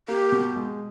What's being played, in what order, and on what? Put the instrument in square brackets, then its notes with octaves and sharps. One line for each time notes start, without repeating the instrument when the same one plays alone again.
[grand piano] A#3 [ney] G4
[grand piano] B2
G#3